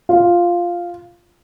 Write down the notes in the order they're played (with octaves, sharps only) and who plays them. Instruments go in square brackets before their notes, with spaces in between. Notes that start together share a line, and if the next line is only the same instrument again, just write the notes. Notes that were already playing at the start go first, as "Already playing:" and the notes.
[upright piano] F4